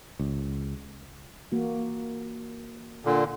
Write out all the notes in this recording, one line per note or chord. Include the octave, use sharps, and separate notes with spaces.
C#2
E3 A#3 F#4
A#2 D3